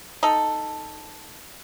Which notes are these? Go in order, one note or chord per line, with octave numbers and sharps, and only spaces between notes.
D#4 A4